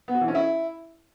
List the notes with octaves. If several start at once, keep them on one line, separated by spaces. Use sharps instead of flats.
B3
F#4
E3
C#4
E4